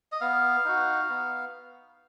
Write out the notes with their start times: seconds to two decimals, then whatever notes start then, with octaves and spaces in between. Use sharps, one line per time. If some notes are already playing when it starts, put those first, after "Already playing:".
0.12 D#5
0.21 B3 F5
0.65 D#4 F#4
1.09 B3